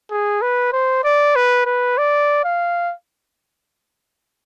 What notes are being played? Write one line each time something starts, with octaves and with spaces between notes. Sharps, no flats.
G#4
B4
C5
D5
B4
B4
D5
F5